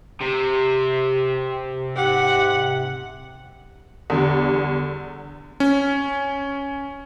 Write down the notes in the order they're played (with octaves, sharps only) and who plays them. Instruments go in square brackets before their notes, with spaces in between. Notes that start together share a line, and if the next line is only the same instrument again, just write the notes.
[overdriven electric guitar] C3 [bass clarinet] G4
[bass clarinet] G#2 [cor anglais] G4 [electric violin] F#5
[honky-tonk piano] E2 D3 G3
[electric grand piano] C#4